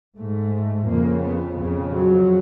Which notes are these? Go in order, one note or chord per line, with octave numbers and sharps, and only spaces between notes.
G#2 A3
F2 C#3 A#3
B3
F2 C#3
F#3